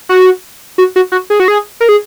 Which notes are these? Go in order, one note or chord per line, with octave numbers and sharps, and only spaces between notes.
F#4
F#4
F#4
F#4
G#4
F#4
G#4
A#4
G#4